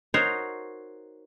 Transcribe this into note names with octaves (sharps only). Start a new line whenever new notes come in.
D#4 F#4 A#4 C5 C#5